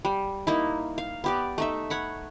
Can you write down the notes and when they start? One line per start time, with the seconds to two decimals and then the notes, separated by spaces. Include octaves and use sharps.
0.05 G3
0.47 A#3 D#4 E4
0.98 F5
1.24 B3 G4 D5
1.58 A3 D#4 E5
1.90 C#5 F#5 B5